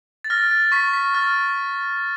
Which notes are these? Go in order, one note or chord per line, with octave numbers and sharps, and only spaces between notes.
A6
F6 A#6
A6
C#6 B6
B6
F6 A6